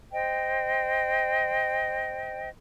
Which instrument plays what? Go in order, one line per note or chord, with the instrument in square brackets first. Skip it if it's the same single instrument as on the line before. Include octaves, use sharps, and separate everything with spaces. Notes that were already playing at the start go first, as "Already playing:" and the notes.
[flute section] C5 D#5 G5